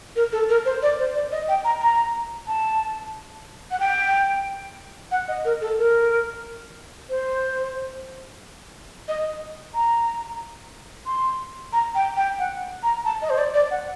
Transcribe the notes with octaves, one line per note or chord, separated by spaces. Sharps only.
A#4
A4
A#4
C5
D5
C5
D5
D#5
G5
A#5
A#5
A5
F#5
G5
F#5
D#5
A#4
A4
A#4
C5
D#5
A#5
C6
A#5
G5
G5
F#5
A#5
A5
D#5
C5
D5
D5
F#5